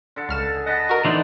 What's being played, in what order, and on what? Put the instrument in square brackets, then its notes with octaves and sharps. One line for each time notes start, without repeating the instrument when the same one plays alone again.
[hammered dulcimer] D3 A4
[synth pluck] C#2 F6 E7
[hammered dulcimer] G#4
[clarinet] D#5 [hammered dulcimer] F#5 A5 B5
[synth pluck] F#4 A#4
[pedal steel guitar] E3 D4 D#4 [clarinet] C6